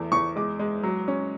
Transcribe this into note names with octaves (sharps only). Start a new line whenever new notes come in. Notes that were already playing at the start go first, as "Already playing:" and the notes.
Already playing: E2 A3
E2 C#6
G#3 D6
G#3
F#3
C#4